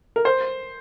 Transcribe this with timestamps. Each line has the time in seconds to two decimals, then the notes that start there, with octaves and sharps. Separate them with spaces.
0.16 A#4
0.25 C5